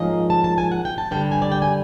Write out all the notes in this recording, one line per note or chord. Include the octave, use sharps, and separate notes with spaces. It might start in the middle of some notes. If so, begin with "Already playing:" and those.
Already playing: G#2 F3 A#3 C#4 D#5
A5
A5
G#5
F#5
G5
A5
G2 D3 G3 G5
G#5
D5
G5
G#5